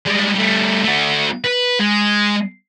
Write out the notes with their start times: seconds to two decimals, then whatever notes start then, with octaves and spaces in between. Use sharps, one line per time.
0.06 G3 G#3
0.35 G3 A3
0.84 A3 F#4
1.44 B4
1.79 G#3